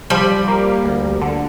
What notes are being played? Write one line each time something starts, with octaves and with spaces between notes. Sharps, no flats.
F3 G3
A#3
D2
D3